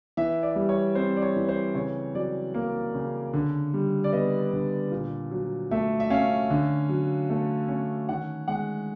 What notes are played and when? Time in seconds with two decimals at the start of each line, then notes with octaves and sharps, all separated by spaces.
0.17 E3 E5
0.43 D5
0.56 G3
0.69 C#5
0.95 C4 C5
1.16 D5
1.22 C#5
1.36 E3
1.49 C5
1.74 C#3 C#5
2.15 F#3 D5
2.54 A#3
2.94 C#3
3.33 D3
3.74 G3
4.04 D5
4.13 B3 D#5
4.52 D3
4.92 A#2
5.31 F#3
5.71 A3 E5
6.00 E5
6.10 C#4 F5
6.50 D3
6.89 F#3
7.30 A3
7.68 C#4
8.09 D#3 F#5
8.48 G#3 F#5